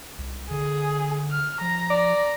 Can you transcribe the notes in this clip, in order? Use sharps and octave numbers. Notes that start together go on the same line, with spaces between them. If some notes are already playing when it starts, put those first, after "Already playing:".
C2
D3 G#4
F6
F3 A#5
D5